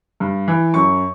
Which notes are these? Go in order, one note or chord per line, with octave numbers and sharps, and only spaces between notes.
G2
E3
F#2 C#6